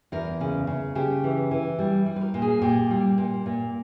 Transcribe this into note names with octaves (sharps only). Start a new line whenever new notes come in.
E2 A#4
C#3
C#3
C#3 G4
E3
E3
G3 E4
G3
B4
A#4
A#2
G#4
A#2 G4
G3
A#2
A#2